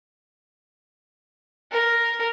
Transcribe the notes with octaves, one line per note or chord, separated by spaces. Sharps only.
A#4